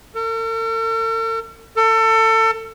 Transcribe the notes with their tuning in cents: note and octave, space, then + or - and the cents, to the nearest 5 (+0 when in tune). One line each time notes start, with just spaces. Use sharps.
A4 +45
A4 +30